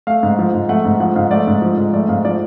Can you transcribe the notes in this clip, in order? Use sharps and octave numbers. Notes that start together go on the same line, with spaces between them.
A3 F5
G#2
F3
G#2
A3 F#5
G#2
F3 F#5
G#2 F5
A3 D5
G#2
F3
G#2
A3 D5
G#2 F5
F3 D5